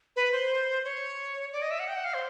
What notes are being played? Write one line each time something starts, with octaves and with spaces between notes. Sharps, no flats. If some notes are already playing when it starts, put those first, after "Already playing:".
B4
C5
C#5
D5
D#5
E5
F#5
G5
F#5
F5
C5